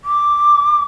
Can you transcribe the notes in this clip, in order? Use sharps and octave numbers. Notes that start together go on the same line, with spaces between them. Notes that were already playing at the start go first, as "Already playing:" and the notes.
D6